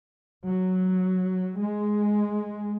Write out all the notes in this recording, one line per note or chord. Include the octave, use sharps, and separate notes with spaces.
F#3
G#3